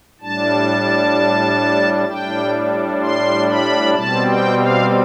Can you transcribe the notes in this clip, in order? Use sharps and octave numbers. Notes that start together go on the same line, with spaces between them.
A2 G3 D4 A5
A2 G3 D4 G5
C6
B5
B2 G3 C4 A5
G5
F5